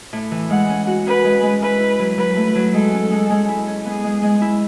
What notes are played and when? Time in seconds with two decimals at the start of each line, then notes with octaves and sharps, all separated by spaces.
0.13 A2
0.31 E3
0.50 G#3 F#5
0.69 C#4
0.87 F#4
1.06 C#4 B4
1.24 G#3
1.43 G#3
1.61 E4 B4
1.80 E4
1.99 F#3
2.18 F#3 B4
2.36 A3
2.55 F#3
2.74 G#3 A4
2.92 C#4
3.11 G#3
3.30 G#3
3.48 E4
3.67 C#4
3.85 B3 G#4
4.04 G#3
4.23 G#3
4.41 E4